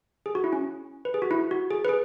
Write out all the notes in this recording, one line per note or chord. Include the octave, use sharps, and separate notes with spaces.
G#4
F#4
E4
C#4
B4
G#4
F#4
E4
F#4
G#4
B4
G#4